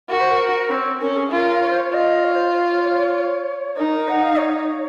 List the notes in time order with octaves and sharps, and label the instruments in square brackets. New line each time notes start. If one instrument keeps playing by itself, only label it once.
[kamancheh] F#4 [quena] A#4
[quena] C5
A#4
[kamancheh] C4 [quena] C#5
[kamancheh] C#4 [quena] A#4
[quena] A#4
G#4
[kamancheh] F4 [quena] A#4
[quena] C#5
C5
C#5
[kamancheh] F4 [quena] D#5
[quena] C#5
C5
C#5
[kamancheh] D#4 [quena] A#4
[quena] A#4
F#5
F5
C#5